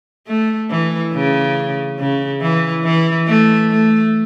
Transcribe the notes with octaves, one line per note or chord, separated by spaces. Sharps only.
A3
E3
C#3
C#3
E3
E3
A3
A3